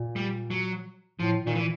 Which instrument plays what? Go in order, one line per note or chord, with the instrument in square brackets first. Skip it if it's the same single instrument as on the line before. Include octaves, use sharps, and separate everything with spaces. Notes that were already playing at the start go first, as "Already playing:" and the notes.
Already playing: [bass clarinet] A#2
[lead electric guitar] G3
F#3
[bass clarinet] A2 [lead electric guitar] F3
[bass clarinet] A#2 [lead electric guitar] D#3
[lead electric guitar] E3